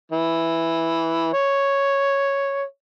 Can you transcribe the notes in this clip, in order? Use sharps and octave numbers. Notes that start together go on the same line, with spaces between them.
E3
C#5